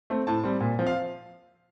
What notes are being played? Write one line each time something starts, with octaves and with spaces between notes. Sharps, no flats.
A3 C4
A2 A5
G3 C4
A#2
F3 C4
F5